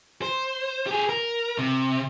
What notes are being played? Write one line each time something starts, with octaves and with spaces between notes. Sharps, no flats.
C5
G4 G#4
A#4
C3